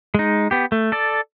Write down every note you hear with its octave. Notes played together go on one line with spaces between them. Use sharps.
G#3 D#4
B3 G4
A3
A4 D5